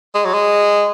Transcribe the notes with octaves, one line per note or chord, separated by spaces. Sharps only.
G#3
F#3
G#3